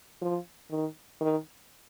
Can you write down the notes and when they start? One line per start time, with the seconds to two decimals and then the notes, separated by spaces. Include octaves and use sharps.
0.22 F3
0.70 D#3
1.21 D#3